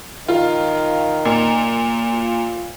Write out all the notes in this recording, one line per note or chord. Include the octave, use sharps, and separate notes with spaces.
D#3 F4
A#2
F4